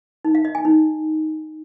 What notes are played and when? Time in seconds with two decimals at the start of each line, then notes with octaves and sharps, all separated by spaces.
0.25 D#4
0.35 F5
0.45 D#5
0.55 G#5
0.65 D#4